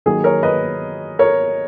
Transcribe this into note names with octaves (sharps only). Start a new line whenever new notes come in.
D#3 F#3 A#3 G#4
A#4 C#5
B4 D#5
A#4 C#5